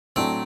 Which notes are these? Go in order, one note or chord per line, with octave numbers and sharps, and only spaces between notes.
A2 F#3 A3 C4 D4